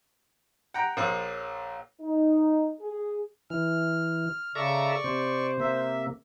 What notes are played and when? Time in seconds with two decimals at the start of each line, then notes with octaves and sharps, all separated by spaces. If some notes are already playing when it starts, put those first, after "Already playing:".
0.74 F#5 G5 A#5
0.97 A#1 A#4 C5 C#5 E6
2.01 D#4
2.80 G#4
3.50 E3 F6
4.55 C#3 A4 D5 E5 A#5 C#6
5.04 C3 C5
5.60 C3 A#3 E5